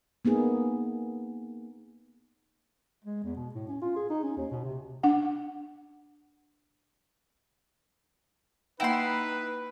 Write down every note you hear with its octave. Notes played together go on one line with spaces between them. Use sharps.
A#3 B3 D#4 G#4
G#3
E2
B2
A2
C#4
F4
G#4
D#4
C#4
D#2
B2
C3
D4 F#5
A#3 D#4 E4 B4 F#5 G5 C6